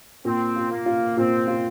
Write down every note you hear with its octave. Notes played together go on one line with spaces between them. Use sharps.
A#2 C4
F4
A#3
F4
A#2 C4
F4